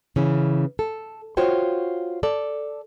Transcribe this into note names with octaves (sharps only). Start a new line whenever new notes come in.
C#3 E3 C#4
A4
F4 F#4 C5 C#5 G5
A4 D5